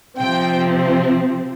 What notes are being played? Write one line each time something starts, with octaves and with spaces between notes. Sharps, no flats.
C3 F3 C4 G5